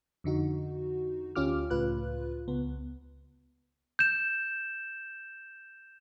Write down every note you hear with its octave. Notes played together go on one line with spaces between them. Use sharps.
F2 D3 D#4 F#4
D2 C#4 F4 G4 D6 F6
C#2 A2 F4 B4 F#6
C#2 B3
G6 E7